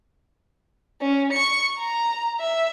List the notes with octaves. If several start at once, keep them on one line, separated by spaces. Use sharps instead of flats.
C#4
C#6 C#7
A#5
E5